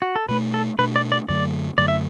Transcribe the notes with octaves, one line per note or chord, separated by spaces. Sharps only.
F#4
A4
B2 A3 D4 B4
A4
B2 A3 D4 B4
D5
D5
F#2 D3 F#3 A3 D5
F#2 D3 F#3 A3 D5
E5